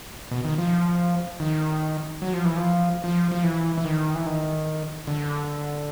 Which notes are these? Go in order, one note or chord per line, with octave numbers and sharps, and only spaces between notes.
B2
D#3
F3
D#3
F#3
F3
E3
F3
F3
F3
E3
E3
D#3
E3
D#3
D3